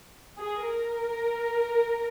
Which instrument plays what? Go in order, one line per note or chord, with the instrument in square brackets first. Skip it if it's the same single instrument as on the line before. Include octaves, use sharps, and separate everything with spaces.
[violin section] G#4
A#4